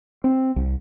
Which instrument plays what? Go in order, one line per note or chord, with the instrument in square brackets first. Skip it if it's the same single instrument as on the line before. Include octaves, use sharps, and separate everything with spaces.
[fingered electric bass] C4
C2